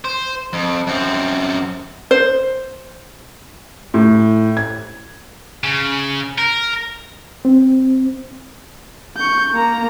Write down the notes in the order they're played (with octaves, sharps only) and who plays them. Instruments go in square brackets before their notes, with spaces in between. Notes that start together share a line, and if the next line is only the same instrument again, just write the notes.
[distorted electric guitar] C5
F2
F#2 C4
[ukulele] C5
[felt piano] A2
G#6
[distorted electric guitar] C#3
A#4
[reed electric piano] C4
[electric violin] C#6 G6
A#3 A#5